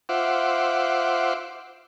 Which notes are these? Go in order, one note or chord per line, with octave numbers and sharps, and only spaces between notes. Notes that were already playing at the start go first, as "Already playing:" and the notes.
F4 C5 E5 F#5 D6